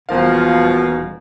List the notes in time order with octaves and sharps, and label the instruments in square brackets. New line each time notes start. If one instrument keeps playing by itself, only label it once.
[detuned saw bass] D#1 [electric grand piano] E2 A#4 F5 [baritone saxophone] B2 [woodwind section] F3